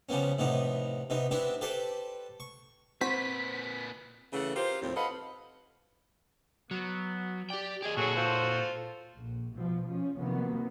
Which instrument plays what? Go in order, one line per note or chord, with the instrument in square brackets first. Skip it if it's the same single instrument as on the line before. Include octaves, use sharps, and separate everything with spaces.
[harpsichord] C#3 F3 G3 B3 C#4
A2 C3 F3 B3 D#4
C3 B3 D#4
B3 C4 D4 E4 G4
G4 A4 B4 C5 D5 G5
C#6
[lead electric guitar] A#2 B4 [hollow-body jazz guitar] C4 [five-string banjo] F#4 C5 [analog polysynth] B6
[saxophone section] C#3 E3 A3 F#5
F4 G4 A#4 C5
D#2 A2 F3 C4
A4 B4 D#5 F5 F#5
[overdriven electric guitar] F#3 [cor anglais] B3
[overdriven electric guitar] G4 G5 [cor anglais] D5
[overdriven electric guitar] G4 D#5 [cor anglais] G#4
[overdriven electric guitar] A#2 C#5 [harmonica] F#3 G#4 A4 [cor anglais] F#4
[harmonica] F4 A4 C5
[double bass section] A#1
B2 F3
F3 C#4
C3 D#3 F3 F#3 A#3 B3